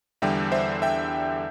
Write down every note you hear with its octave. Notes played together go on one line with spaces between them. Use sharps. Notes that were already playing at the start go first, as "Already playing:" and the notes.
E2 D3 G3 E5 G5
C5 E5
E5 G5